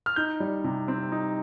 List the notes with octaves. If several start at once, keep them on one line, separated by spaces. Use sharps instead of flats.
F6
D#4 G6
G3
C3
C4
D#4